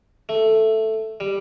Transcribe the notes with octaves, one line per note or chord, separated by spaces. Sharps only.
A3
G3